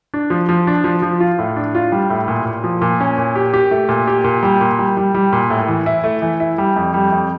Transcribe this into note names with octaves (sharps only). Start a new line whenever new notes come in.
D4
F3
F3
D4
F3
F3
F4
A2
D4
F4
G3
A2
A#2
A#2
F3
A#2
C#4
A#2
G4
G4
A3
A#2
G4
A#2
G3
A#2
G3
G3
G3
A#2
A2
E3
E4
A3
E3
E4
G3
F2
G3
F2